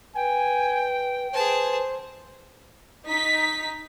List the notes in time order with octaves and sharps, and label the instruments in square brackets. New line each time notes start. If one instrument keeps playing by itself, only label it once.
[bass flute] B4 [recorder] G5 [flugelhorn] G#5
[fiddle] G#4 A5 [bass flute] B4 [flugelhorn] C5
[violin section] D#4 B6